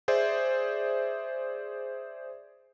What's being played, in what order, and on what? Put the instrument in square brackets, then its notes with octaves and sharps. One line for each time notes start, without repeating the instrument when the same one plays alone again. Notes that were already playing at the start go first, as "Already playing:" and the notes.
[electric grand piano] G#4 C5 D5 E5